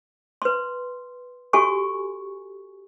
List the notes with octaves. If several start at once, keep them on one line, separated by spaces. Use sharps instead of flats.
B4 C6
F#4 G4 A4 G#5 C#6